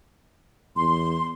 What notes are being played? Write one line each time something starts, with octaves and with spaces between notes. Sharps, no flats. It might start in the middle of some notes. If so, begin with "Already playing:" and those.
E2 C6